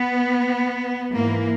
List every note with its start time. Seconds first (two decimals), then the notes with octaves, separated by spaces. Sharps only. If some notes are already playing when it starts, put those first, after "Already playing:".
Already playing: B3
1.12 G#2 E3 A#3